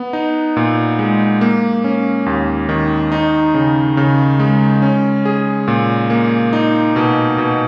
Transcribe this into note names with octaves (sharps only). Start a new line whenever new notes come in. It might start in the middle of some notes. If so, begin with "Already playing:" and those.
Already playing: B3
D#4
A#2
G#3
A#3
C#4
D#2
D#3
D#4
C#3
C#3
G#3
C#4
G#4
A#2
A#3
D#4
B2
B2